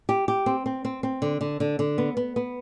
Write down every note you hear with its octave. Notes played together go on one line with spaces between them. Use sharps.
G4
G4
C4
C4
C4
C4
D3
D3
D3
D3
B3
B3
B3